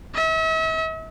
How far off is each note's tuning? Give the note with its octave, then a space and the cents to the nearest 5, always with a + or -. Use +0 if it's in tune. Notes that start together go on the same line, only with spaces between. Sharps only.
E5 -40